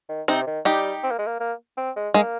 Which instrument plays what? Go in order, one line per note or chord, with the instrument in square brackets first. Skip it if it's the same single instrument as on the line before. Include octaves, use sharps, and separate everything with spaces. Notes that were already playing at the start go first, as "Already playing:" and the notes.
[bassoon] D#3
[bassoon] C3 [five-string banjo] C4 D#4
[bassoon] D#3
[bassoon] G3 [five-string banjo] D#4 G4
[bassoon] C4
A#3
G#3
A#3
A#3
C4
G#3
[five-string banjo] G#3 [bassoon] A#3